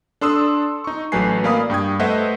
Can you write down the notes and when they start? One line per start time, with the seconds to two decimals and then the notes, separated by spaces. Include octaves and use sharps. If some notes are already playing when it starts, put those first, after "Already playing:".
0.21 D4 A4 C6 D#6 E6
0.84 D#4 C#6
1.12 A1 F#3 A3 B4 G#5 C7
1.44 A#3 D5 F5 B5 D#6
1.70 G2 G5 D#6 G#6
1.99 A3 B4 C5 D#5 E5 F#5